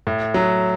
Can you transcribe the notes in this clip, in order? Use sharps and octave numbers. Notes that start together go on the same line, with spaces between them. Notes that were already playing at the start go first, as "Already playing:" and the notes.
A2
F#3